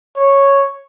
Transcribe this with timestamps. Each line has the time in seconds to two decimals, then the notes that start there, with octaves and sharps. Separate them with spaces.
0.17 C#5